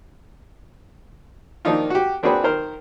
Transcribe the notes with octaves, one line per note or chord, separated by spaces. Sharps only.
D#3 F3 A#3 D4 D#4 F4
F#4 G4
A#3 C4 D4 F#4 G#4 B4
D#3 A#4 C5 F6